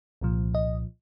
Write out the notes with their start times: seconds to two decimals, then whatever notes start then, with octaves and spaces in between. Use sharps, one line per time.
0.21 C2 A#2 F3
0.55 D#5